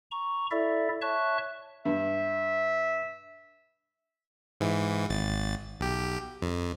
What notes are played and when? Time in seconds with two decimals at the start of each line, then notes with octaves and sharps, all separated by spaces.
0.11 A#5 C#6
0.51 E4 A4 D5 E5
1.02 C#5 E5 A5 C#6 F#6
1.85 G2 E5
4.61 G#2 E3
5.09 G#1 A6
5.80 B1 G4
6.42 F2